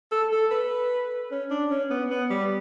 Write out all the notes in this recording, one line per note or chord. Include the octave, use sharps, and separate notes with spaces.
A4
A4
B4
C#4
D4
C#4
B3
B3
G3